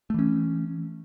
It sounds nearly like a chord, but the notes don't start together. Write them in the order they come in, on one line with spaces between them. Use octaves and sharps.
A3 E3 C#4